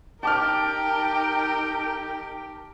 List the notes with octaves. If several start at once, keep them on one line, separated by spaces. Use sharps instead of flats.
D#4 G4 A#4 G5 A5 D6 F6